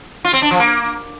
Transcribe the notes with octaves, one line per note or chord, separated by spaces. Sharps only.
F4
C4
D4
F3
A#3